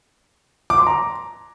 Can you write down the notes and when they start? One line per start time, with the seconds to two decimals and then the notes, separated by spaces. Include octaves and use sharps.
0.70 D6
0.78 C6
0.87 A#5